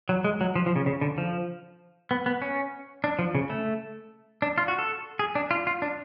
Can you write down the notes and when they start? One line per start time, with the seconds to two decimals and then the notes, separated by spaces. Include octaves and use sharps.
0.09 F#3
0.24 G#3
0.41 F#3
0.56 F3
0.66 F3
0.76 C#3
0.86 C#3
1.01 D3
1.18 F3
2.11 B3
2.26 B3
2.42 C#4
3.04 D4
3.19 F3
3.35 C#3
3.50 A3
4.42 D4
4.58 F4
4.68 F#4
4.79 A4
5.19 G#4
5.35 D4
5.51 F4
5.67 F4
5.82 D4